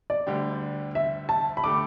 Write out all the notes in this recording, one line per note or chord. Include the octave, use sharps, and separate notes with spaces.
D5
D2 D3 G3 D4 G4
E5
A5
B5
D3 A3 G4 D6